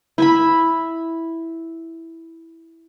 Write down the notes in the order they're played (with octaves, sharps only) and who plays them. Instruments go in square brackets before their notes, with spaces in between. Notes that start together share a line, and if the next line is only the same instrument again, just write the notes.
[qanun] E4 E5 B5